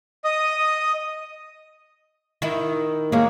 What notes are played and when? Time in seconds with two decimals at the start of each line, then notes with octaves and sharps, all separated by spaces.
0.25 D#5 D#6
2.42 D#3 D#4 E4
3.12 G#3 A#3 C#4